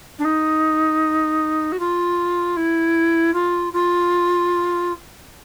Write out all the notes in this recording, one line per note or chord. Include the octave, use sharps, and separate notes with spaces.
D4
D#4
F#4
F4
E4
F4
F4